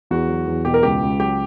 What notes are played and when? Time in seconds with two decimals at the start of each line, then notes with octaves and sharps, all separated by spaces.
0.11 E2 F#4
0.28 F#3
0.47 E2
0.65 B2 G4
0.74 A#4
0.83 C#2 G4
1.02 C#2
1.20 F#3 G4